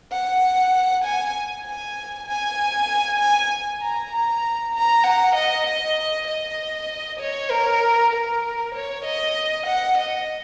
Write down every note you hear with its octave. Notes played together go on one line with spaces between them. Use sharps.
F#5
G#5
G#5
G#5
G#5
A#5
A#5
A#5
F#5
D#5
D#5
D#5
C#5
A#4
A#4
C#5
D#5
F#5
D#5